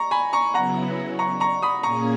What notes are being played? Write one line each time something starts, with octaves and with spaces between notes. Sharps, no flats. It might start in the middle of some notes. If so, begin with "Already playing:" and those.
Already playing: A#5 C#6
G#5 B5
A#5 C#6
C#3 F#3 B3 E4 F#5 A#5
A#5 C#6
A#5 C#6
B5 D#6
A#2 A#3 C#4 G#4 A#5 C#6